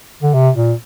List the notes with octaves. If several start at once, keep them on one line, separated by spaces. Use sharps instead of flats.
D3
C3
A#2